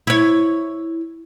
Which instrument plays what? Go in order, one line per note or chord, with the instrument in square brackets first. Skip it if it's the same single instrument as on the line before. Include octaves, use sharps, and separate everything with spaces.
[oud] E4 C#5